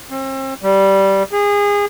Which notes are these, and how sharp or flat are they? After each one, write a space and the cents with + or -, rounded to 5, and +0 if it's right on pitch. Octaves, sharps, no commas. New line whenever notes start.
C4 +40
G3 -10
G#4 -25